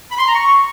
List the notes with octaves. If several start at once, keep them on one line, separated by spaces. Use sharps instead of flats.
B5
C6
A#5
C#6